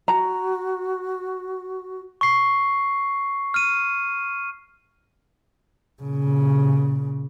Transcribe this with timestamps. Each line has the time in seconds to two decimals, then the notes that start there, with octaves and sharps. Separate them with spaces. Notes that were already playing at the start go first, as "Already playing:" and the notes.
0.08 F#4 A#5
2.21 C#6 C7
3.54 F6 D#7
6.02 A#2 C#3